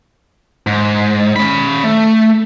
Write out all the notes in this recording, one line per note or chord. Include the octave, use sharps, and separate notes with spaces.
G#2
C#4 B5
A3